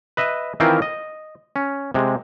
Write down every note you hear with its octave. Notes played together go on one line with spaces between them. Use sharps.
B4 D#5 E5
D#3 E3 C4 E4 F4 A#4
D#5
C#4
C3 G#3